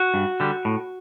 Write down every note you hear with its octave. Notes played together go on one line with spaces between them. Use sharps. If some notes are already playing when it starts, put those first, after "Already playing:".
Already playing: F#4
G2
D3 G3
A2